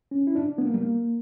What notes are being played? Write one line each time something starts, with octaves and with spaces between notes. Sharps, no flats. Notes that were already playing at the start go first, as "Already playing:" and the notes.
C#4
E4
D4
B3
A#3
G3
A#3